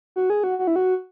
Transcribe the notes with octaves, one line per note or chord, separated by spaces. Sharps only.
F#4
G#4
F#4
F#4
E4
F#4